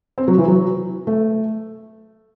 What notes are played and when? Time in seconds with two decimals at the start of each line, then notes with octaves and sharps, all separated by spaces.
0.18 C4
0.28 F#3
0.38 E3
0.48 F#3
1.07 A3